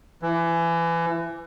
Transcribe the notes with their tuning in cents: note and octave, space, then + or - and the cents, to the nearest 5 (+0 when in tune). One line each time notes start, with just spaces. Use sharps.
E3 +25